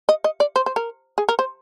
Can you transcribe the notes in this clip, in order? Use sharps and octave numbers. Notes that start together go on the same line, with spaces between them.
D#5
D#5
D5
C5
C5
A#4
G#4
A#4
C5